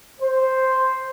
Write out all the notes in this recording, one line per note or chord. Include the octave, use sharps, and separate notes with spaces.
C5